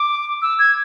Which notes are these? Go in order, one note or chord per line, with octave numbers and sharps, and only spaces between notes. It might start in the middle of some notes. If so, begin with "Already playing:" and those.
Already playing: D6
E6
G#6